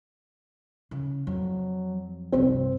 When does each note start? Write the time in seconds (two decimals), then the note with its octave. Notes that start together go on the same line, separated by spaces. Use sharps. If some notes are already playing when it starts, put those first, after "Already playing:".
0.91 C#3
1.27 F2 F#3
2.32 F1 C2 G2 C4